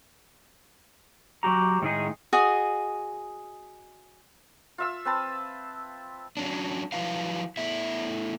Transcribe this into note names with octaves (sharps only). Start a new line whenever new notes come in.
F#3 F#4 G4 A#5
A2 D#3 G#3 A3 D#4 G#4
F#4 G#4 D#5
F4 E5 E6
C4 B4 A5
F#3 C#4 D4
F3 F#3 E4 B4 F5
A3 B3 E4 E5